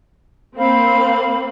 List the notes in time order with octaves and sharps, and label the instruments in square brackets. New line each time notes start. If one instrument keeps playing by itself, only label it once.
[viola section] A#3 C4 [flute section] F5 B5